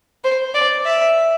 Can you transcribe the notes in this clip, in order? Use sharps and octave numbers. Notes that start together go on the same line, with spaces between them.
C5
D5
E5